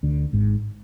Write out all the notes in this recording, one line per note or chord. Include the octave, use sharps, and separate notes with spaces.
D2 D3
G#1 G#2